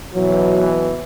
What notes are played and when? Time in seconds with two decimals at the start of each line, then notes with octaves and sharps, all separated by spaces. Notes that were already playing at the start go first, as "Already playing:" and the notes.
0.14 B2 E3 F#3